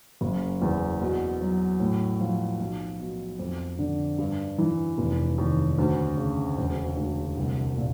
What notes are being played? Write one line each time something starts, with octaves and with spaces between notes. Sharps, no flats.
F#1
E2
B2
F#3
A2
F3
B1
B2
F2
D3
G2
E3
F1
D#2
D2
C#3
E1
D2
C2
A#2